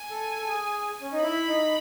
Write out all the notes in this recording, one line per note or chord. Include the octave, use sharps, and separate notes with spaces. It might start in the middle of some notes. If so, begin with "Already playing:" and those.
Already playing: G#5
A4
A4
G#4
C#4
D#4
E4 B5
D#4